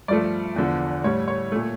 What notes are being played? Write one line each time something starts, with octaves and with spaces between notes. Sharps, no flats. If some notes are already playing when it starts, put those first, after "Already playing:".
G2 F3 A3 D5
E2 D3 F3
A2 G3 C#5
C#5
A#2 A3